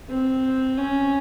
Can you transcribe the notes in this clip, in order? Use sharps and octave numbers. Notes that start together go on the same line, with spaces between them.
C4
C#4